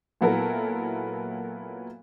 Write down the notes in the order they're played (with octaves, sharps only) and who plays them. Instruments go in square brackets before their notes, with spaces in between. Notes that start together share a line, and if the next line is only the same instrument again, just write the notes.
[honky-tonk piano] A#2 F#3 B3 E4 A4 A#4